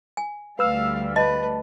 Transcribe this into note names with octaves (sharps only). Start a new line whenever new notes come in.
G#5
D2 G3 B4 F5 E6 F6
B4 D#5 A5